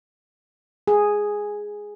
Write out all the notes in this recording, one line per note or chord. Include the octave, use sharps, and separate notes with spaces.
G#4